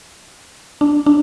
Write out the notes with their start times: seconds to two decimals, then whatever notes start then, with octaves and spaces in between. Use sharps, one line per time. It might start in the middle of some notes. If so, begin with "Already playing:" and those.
0.81 D4
1.06 D4